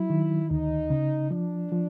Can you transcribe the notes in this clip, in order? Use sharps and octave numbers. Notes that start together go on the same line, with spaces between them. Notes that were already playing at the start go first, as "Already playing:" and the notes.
Already playing: F#3 E4
D#3
D2 D#4
C#3
F3 D4
F3